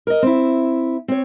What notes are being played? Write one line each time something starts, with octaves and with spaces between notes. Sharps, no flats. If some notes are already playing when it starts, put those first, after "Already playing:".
A#4 D#5
C4 E4
C4 C#5